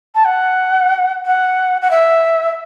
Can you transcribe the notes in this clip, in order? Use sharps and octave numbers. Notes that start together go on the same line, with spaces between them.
A5
F#5
F#5
F#5
E5